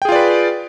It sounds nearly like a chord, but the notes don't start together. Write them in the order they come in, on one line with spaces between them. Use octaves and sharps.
G5 G#4 F4 D5 B4